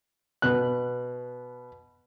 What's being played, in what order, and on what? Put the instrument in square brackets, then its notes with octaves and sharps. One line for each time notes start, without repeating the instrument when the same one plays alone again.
[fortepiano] B2 F#6